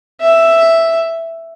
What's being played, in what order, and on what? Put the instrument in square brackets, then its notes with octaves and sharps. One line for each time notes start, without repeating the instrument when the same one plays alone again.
[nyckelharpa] E5